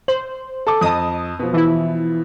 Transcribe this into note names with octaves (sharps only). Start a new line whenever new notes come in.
C5 F#7
A4 A5 D6
F2 D#5 A5 D#6
B2 F3
E3 E4